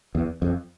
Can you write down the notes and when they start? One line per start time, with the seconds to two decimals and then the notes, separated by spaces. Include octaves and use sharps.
0.15 E2
0.42 F2